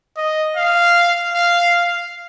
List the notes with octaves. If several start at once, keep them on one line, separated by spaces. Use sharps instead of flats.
D#5
F5
F5